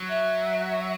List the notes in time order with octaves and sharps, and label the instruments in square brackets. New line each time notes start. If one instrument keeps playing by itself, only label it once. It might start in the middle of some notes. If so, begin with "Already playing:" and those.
Already playing: [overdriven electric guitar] F#3
[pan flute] E5